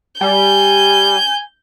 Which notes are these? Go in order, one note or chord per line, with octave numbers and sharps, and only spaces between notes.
G3 G#5 G6